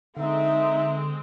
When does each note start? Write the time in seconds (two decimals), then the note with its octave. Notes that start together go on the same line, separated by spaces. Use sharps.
0.16 D3 G#3 C4 D#4 E5